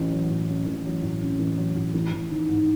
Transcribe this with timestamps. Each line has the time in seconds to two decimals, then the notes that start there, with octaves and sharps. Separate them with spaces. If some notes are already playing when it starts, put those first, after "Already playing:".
Already playing: A1 C#4
0.11 F#3
0.29 A2
0.48 C#4
0.66 A1
0.84 F#3
1.02 A2
1.21 C#4
1.39 A1
1.57 F#3
1.76 A2
1.94 A1
2.12 A1
2.30 D#3
2.49 G#2